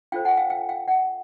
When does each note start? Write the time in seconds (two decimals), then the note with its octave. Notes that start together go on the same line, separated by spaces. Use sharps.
0.12 D4 F4 A4 C5 F5 G5
0.25 F#5 G#5
0.37 F5 G5
0.50 F5 G5
0.69 F5 G5
0.88 E5 F#5